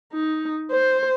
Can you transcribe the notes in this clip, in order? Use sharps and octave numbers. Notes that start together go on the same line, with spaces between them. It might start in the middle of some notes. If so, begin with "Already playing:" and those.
D#4
C5